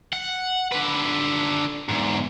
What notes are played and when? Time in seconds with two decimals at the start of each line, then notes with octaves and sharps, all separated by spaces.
0.13 F#5
0.72 D3 B4
1.89 E2 G#2